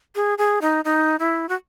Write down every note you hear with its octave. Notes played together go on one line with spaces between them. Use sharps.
G#4
G#4
D#4
D#4
E4
F#4